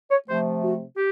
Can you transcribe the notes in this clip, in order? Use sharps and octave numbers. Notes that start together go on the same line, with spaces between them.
C#5
C3 F3 A3 C5
F#4
G4